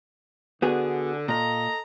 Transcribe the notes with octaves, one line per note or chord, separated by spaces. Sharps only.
D3 B3 F#4 G#4
A#2 A4 D#5 A#5